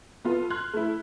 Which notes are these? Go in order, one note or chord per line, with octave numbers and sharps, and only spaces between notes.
B3 F4 A4
C6 F6 F#6 G#6
A3 E4